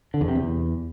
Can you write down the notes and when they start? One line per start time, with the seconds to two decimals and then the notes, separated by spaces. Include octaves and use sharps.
0.14 D3
0.21 E2
0.28 C3
0.35 E2